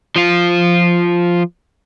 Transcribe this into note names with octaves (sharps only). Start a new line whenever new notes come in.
F3 F4